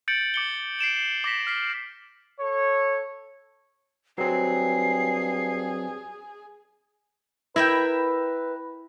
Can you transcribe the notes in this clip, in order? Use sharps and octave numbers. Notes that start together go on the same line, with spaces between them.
G6 A6 C#7 D7 F#7
D6 C#7 G7
C7 D7 E7 F#7
D6 A#6 B6
D6 F6 B6 C7
A4 C#5
G2 F#3 C4 G#4 C7
E4 A#4 B4 E5 G5